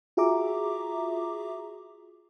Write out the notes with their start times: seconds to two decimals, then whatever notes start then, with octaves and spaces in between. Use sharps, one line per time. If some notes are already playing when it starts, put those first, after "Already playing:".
0.17 F4 F#4 G#4 E5 A#5 D6